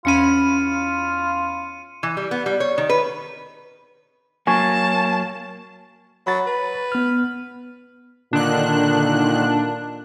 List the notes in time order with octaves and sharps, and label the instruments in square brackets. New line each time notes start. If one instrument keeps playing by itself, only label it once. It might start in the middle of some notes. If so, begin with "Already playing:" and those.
[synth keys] E2 C#4 B5 [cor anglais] F4 [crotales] C#7 D#7
[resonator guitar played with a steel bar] E3
G3
B3
G3
C#5
D#3
B4
[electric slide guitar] F#3 A#3 [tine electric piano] G#5 C#6 G#6 [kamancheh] A5
[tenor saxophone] F#3 [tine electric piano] B5 A6
[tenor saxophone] B4
[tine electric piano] B3 F6
[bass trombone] A#2 [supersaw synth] D3 D#3 F#6 [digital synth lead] D4